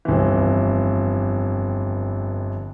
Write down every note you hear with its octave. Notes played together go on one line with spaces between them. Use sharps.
G1 F2 E3